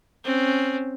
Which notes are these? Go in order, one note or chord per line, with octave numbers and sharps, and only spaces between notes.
C4 C#4